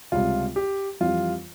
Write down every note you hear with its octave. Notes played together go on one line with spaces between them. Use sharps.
C#2 C3 G3 F4
G4
F2 E3 G3 F4